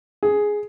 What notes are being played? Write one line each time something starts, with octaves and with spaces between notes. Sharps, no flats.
G#4